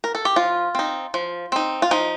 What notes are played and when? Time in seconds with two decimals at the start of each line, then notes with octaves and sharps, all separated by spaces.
0.04 A#4
0.15 A4
0.25 G4
0.36 F3 F4
0.75 C4 D#4
1.14 F3
1.52 C4 D#4
1.82 F4
1.91 F3 D#4